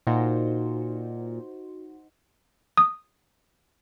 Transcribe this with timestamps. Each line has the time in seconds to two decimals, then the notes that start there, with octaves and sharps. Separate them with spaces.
0.07 A#2 D#4 F#4 C5
2.77 D#6